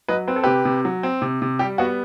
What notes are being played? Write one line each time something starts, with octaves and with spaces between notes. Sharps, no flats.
F#3 B4 D#5
C4 B4
A4
C3 G4 B4
C3
F#3
C4
C3
C3
G3 G4
B3 F#4